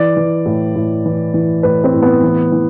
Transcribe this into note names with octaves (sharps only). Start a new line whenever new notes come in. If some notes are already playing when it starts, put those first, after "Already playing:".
Already playing: E3 D5
E3
A2
A2
E3
E3
A2 B4
C4
A2
B3
E3
E3